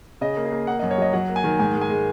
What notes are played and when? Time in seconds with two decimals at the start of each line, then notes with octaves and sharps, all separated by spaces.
0.21 C#3 D#5
0.36 A#3
0.45 G#4
0.52 A#3
0.67 A#3 F#5
0.79 D#5
0.82 F#2
0.91 C#5
0.98 F#3 D#5
1.13 F#3 F#5
1.29 A#3
1.36 G#5
1.44 D#3
1.59 G#2 G#5
1.74 G#3
1.81 G#5
1.90 G#3